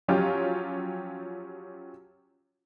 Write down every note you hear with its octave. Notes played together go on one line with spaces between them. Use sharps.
F3 F#3 C#4 F4 G4